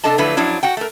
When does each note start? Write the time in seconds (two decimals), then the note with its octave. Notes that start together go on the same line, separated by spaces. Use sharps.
0.04 C3 D4 A4 D#5 A5
0.18 D3 F3 F#3 A3 E4 B4
0.37 F#2 F3 F#3 D4 E4
0.63 F#4 F#5 G5
0.77 A3 A#4